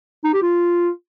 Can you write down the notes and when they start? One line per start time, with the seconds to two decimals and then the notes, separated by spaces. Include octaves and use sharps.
0.24 D#4
0.33 G4
0.42 F4